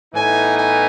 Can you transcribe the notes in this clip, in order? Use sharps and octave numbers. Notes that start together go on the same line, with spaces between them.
A2 E3 B3 D#4 G#5
G#5